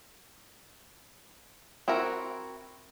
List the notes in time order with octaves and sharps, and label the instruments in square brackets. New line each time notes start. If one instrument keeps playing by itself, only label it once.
[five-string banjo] C4 E4 F#4 A#4